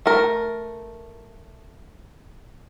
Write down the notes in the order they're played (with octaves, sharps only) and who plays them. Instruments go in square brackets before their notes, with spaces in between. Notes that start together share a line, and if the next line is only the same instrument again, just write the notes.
[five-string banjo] A3 A#4